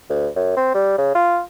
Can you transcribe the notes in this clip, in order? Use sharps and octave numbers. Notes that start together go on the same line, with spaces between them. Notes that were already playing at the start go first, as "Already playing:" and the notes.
D2
F#2
C4
G3
C#3
F4